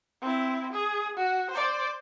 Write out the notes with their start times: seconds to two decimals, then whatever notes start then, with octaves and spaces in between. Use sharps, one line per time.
0.22 C4 E4
0.73 G#4
1.17 F#4
1.51 C5 D5